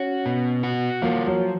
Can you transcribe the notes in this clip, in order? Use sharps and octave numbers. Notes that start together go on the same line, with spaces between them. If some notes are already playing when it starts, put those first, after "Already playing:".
Already playing: C#4 F#4
B2
F#4
F3 A#3
F#3